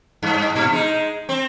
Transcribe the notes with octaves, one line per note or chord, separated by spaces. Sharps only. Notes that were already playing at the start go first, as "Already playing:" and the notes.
G2
A#2
G#3 D#4
C4